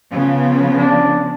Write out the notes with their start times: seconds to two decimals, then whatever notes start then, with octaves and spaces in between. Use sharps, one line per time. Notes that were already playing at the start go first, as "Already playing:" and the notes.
0.11 C#3 F3 B3
0.77 D4